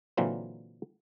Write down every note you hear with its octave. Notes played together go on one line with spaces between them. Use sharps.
A#2 D3 E3 F#3 A#3 C4